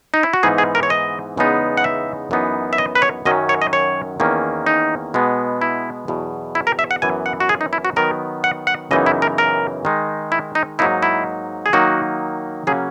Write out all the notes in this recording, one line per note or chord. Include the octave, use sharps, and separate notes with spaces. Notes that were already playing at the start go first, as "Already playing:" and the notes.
D#4
E4
F#4
G#2 E3 B3 D#4 G#4
G#4
A#4
C#5
D#5
E2 C#3 G#3 B3 D#4
F#5
E5
F#2 E3 B3 D#4
E5
D#5
B4
C#5
F#2 D#3 F#3 C#4 D#5
C#5
D#5
C#5
E2 D#3 A#3 C#4
D#4
B2 G#3 B3
E4
E2 B2 F#3
E4
A#4
E5
F#5
F#2 E3 B3 G#5
F#5
F#4
G#4
D#4
E4
F#4
D#3 F#3 B3 A#4
F#5
F#5
F#2 C#3 E3 B3 D#4 D#5
E4
A#4
A#4
D#3 G#3 D#4
E4
D#4
G#2 F#3 A#3 D#4 E4
E4
G#4
D#3 F#3 A#3 D#4 F#4
C#3 F#3 A#3 C#4 G#4